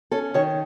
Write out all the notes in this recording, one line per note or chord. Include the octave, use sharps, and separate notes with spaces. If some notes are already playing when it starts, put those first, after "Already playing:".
C#4 A4
D#3 C#5